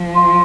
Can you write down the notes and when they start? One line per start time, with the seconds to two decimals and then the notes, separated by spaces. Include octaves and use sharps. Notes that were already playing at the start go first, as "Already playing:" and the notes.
Already playing: F3
0.15 F4